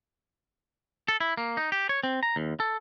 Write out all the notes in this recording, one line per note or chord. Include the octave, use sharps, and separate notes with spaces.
A4
E4
A#3
D#4
G4
C#5
C4
A#5
D#2
A4